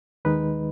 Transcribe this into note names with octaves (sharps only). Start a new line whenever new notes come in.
D#2 D#3 G#3 D#4 B4